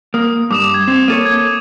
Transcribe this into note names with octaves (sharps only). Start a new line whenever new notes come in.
A#3 D#6
G2 D6 D#6 E7
G#6
C4
A#3 A4 C#5 D#7
G#6